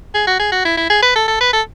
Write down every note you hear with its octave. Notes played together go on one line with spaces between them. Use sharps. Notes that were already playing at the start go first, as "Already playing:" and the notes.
G#4
F#4
G#4
F#4
E4
E4
G#4
B4
A4
A4
B4
A4